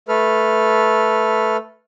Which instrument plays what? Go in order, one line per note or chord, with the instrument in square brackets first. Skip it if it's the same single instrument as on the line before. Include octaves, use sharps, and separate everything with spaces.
[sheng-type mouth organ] A3 A4 B4 F6